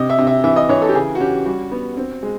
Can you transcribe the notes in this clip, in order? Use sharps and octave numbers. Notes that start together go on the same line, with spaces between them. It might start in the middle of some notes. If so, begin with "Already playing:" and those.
Already playing: C3 D#5
E5
C3
E5
E3 E5
D#5
E3 C#5
A4
G4
C#3 G#4
F#4
C#4 G4
G3 F#4
B3
C4
G#3